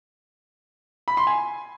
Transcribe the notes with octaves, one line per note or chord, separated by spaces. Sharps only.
B5
C6
G#5